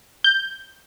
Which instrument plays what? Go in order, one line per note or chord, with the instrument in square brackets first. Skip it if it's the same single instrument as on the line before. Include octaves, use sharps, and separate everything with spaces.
[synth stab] G6